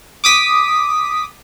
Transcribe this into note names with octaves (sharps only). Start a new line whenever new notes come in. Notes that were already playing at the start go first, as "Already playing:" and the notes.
D6 D#6 B6